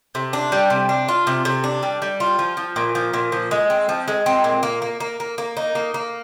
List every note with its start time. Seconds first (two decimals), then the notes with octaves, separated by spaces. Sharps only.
0.15 C3
0.33 D4
0.52 G3
0.70 C3
0.89 D4
1.08 F4
1.27 C3
1.45 C3
1.64 D4
1.83 G3
2.02 G3
2.20 F4
2.39 F3
2.57 F3
2.76 A#2
2.95 F3
3.13 A#2
3.32 F3
3.51 G#3
3.70 C4
3.89 F3
4.08 G#3
4.26 C4
4.44 A#2
4.63 A#3
4.82 A#3
5.00 A#3
5.20 A#3
5.38 A#3
5.57 D#4
5.75 A#3
5.94 A#3